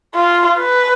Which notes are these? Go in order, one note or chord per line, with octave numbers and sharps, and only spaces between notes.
F4
B4